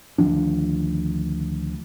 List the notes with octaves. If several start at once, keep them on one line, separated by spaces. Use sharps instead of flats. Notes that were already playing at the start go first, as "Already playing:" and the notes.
D2 D#3 F3 D4